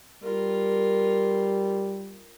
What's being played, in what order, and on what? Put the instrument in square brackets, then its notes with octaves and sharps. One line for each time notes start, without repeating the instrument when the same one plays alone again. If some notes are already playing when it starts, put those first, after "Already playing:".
[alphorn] G3 [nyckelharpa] F4 A#4